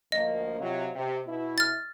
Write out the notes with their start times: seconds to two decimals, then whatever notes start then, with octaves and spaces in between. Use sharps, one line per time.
0.12 D2 F3 A#3 D#5
0.60 C3 F#3 F4
0.94 C3
1.26 B2 E4
1.58 F6 A6